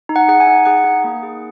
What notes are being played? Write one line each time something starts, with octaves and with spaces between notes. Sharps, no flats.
D#4
F#5
G#4 F#5
G#5
D#4
G#4 F#5
D#4
A#3
G#4